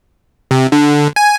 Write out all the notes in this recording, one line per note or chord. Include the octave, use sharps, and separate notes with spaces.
C3
D3
G#5